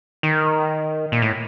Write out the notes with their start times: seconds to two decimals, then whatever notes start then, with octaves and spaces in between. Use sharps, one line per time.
0.23 D#3
1.12 A#2
1.22 A2